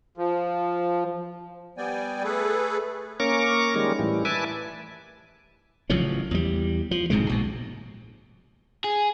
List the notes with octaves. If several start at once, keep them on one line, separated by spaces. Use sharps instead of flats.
F3
G3 B3 D5 G5 G#5
A3 G#4 A4 B4
A#3 C#4 A#5 C#6 D6
D#3 G3 G#3 A#3 C#4
A2 E3 G3
B4 E5 G#5 A5 D6
A1 C#3 F3 F#3
E2 G3
F3
D1 G#2 C3 G#3
A#1 B2
G#4